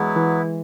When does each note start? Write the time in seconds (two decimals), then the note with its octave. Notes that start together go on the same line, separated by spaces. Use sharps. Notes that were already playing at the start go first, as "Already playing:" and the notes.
Already playing: E3 F#3 G#3 B3 E4
0.16 E3